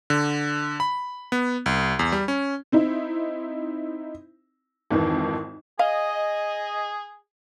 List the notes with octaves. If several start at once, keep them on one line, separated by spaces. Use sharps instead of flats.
D3
B5
B3
C2
E2
G3
C#4
C4 D#4 E4
G#1 F2 D#3 E3
G#4 D#5 F5